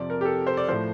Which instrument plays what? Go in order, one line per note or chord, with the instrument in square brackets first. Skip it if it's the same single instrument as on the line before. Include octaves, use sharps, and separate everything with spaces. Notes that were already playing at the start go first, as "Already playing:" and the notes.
Already playing: [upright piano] F2 C3 F3 D5
A#4
G4
A4
C5
D5
A2 F3 C5